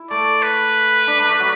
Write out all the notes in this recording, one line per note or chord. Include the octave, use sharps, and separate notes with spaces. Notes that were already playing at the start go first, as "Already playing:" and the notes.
Already playing: E4
A3 D5
B4
D4
D4
A3
F#3